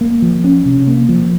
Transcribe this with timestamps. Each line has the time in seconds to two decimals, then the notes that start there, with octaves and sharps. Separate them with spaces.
0.01 A#3
0.22 F3
0.44 C#4
0.65 C3
0.87 A#3
1.09 F3